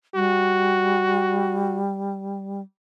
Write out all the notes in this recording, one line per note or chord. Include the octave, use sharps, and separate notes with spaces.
G3 F#4